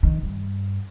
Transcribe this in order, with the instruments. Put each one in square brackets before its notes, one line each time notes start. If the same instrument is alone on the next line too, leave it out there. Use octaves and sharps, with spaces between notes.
[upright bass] D#3
G2